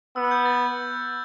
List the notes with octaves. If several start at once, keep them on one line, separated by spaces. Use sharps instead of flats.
B3 E6
F#6
G6
A6